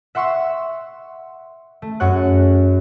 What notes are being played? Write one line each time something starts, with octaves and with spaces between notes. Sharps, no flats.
E5 F#5 C6 C#6 E6
A3
F#2 F#4 G#4 C#5 F#5 F#6